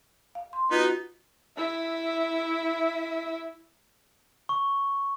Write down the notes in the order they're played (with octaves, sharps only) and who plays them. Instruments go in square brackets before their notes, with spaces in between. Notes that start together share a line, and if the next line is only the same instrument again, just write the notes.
[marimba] F5
C6
[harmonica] B3 D#4 [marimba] F4 F#4
[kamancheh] E4 E5
[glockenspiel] C#6